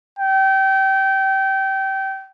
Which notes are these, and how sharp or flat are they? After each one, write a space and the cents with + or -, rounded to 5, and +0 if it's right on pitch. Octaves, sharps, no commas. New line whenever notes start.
G5 -25